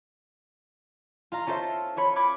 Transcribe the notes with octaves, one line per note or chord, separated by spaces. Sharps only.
F4 F5 A#5
C#4 F4 A4 C5 E5
F4 C#5 B5
B5 D6 G#6